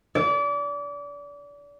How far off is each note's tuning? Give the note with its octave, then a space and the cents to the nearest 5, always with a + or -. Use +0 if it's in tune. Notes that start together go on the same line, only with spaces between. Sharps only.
D5 -30